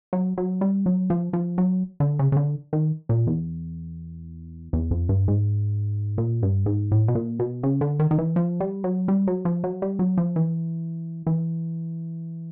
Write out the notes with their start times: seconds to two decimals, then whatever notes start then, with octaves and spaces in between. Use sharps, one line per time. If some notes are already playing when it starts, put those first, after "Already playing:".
0.13 F#3
0.37 F#3
0.61 G3
0.86 F#3
1.10 F3
1.33 F3
1.58 F#3
2.00 D3
2.19 C#3
2.32 C#3
2.36 D3
2.73 D#3
3.09 A#2
3.27 E2
4.73 E2
4.91 F2
5.09 G2
5.28 G#2
6.18 A#2
6.43 G2
6.66 G#2
6.91 A2
7.08 B2
7.15 A#2
7.39 B2
7.63 C#3
7.81 D3
7.99 D#3
8.11 D#3
8.18 E3
8.36 F3
8.60 G3
8.84 F#3
9.08 G3
9.28 F#3
9.45 F3
9.64 F#3
9.82 G3
9.99 F#3
10.17 F3
10.36 E3
11.27 E3